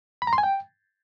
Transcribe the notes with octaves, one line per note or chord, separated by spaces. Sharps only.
B5
A#5
C6
G#5
G5